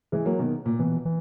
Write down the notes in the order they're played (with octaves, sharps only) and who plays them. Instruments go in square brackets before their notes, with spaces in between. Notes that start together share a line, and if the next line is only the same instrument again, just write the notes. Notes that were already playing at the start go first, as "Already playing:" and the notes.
[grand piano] E3 G#3
F#3 A#3
B2 D#3
A#2
[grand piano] B2 [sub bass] E3
[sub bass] E3